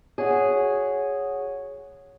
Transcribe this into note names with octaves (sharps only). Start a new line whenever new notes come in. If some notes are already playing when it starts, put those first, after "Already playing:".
F#4 G#4 C#5